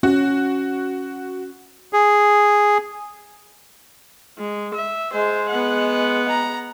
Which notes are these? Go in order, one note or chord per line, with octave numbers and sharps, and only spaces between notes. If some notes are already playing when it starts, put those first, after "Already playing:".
C#4 F#4
G#4
G#3
E5
G#3 C5
B3 F#5
A#5